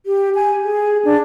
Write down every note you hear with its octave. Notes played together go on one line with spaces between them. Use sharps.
G4
G#5
G#4
D4